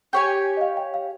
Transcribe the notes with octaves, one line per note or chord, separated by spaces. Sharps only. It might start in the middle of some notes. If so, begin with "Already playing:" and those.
G4 C#5 G5 G#5
D#5
F5
G5
F5